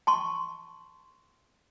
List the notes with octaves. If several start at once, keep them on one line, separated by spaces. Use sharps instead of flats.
A5 C6 C#6